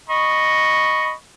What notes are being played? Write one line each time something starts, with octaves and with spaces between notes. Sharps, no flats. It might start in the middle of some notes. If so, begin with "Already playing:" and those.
D#5 B5 C#6